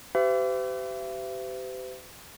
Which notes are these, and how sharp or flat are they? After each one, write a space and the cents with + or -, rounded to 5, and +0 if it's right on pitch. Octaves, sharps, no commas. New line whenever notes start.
G4 -30 C5 -45 E5 +35